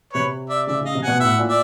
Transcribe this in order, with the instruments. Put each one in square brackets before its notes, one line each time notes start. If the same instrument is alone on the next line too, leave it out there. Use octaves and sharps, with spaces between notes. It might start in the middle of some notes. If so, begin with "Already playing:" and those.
[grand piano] C3 [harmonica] B4 C#5
[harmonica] D5 E5
[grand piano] C#3 [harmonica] D5 E5
[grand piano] C#3 [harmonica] D#5 F5
[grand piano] C3
[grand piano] B2 [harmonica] F#5 G#5
[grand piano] A2 [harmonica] E5 F#5
[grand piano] A#2
[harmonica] D5 E5